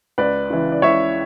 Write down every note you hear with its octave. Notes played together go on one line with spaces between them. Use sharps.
C#2 B4 D5
C#3 E3
D5
C#2 C#5 E5